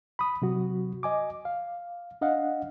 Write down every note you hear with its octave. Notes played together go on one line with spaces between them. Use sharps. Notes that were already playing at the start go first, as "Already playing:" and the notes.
B5 D#6
C3 F#3 F#4
D#5 G#5 D6
F5
D4 D#5 F5 F#5